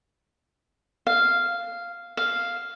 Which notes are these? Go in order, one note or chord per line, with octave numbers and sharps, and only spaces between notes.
F5
F5